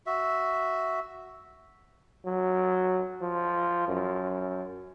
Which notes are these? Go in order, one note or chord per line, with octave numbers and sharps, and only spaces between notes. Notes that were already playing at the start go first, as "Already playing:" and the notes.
F#4 E5
F#3
F3
F#2